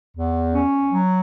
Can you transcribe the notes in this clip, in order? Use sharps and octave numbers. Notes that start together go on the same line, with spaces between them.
E2
C#4
F#3